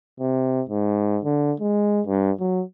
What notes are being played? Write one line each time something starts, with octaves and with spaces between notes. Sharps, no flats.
C3
G#2
D3
G#3
G2
F#3